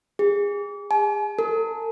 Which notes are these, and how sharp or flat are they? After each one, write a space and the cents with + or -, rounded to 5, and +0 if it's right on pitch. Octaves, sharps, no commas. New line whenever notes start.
G#4 -30
G#5 +45
A4 +45